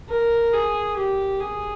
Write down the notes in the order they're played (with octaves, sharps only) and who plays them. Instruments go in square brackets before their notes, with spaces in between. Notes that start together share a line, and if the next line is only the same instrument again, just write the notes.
[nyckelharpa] A#4
G#4
G4
G#4